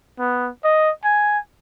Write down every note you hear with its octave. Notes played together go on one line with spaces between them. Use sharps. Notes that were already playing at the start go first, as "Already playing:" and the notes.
B3
D#5
G#5